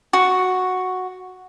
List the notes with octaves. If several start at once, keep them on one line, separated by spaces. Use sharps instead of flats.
F#4